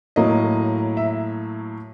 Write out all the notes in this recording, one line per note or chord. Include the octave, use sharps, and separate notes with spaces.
A2 F#3 A#3 D#5
E5